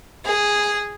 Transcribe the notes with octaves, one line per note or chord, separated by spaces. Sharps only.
G#4